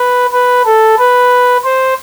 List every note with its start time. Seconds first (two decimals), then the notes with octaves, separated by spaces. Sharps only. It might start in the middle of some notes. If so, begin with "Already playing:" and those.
Already playing: B4
0.33 B4
0.65 A4
0.98 B4
1.64 C5